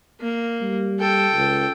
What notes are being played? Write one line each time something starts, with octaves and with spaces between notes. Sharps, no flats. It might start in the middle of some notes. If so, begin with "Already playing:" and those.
A#3
G3
A4 G5
C#2